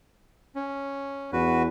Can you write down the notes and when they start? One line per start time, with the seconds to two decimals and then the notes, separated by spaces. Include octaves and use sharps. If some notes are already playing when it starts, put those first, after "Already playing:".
0.55 C#4
1.33 E2 F#4 B4